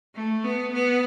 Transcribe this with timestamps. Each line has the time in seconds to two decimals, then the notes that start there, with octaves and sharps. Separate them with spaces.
0.16 A3
0.45 B3
0.74 B3